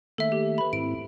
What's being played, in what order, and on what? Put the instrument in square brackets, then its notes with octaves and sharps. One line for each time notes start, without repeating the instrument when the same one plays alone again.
[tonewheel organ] D#3 A3 A#3 [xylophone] A4 E5
[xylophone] G4
B4 B5
[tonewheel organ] G#2 C4 E4 [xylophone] D7